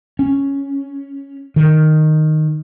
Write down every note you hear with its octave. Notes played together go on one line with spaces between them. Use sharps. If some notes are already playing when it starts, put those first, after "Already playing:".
C#4
D#3